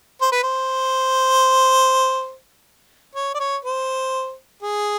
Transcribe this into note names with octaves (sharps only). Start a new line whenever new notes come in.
C5
B4
C5
C#5
D5
C#5
C5
G#4